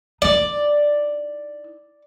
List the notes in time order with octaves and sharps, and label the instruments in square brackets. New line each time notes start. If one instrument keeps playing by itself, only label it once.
[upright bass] D#4 E4 [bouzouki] D5